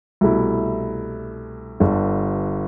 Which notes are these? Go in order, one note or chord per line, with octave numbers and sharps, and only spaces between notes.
C2 B2 A3 E4
G1 G2 D3